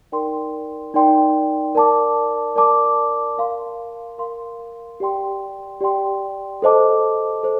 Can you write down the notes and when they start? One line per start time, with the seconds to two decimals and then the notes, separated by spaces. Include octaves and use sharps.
0.12 D#4 A#4 D5 G5 C6
0.94 D#4 A#4 D5 G5 C6
1.75 A#4 D5 A5 D6
2.56 A#4 D5 A5 D6
3.38 A#4 F5 C6
4.18 A#4 F5 C6
5.00 G4 D5 G5 C6
5.81 G4 D5 G5 C6
6.62 A4 C5 D#5 A5 D6
7.43 A4 C5